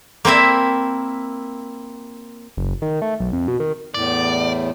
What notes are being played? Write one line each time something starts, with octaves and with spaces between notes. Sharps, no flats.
A#3 C4 E4 E5
F#1
D#3
A3
B1
F2
B2
D#3
E2 A2 D5